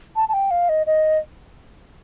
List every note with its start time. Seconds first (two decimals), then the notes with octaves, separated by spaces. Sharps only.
0.16 A5
0.29 A5
0.33 G5
0.51 F5
0.69 D#5
0.87 D#5